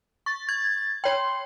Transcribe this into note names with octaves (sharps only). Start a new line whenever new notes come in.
C#6 A6
G#6
C#5 G5 C6